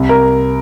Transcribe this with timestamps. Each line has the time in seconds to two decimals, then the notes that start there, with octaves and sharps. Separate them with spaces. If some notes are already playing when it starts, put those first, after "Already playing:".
Already playing: C2
0.09 A#4